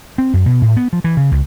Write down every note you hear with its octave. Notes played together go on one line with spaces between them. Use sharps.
C4
F#2
B2
A2
B3
F3
E3
C#3
C#2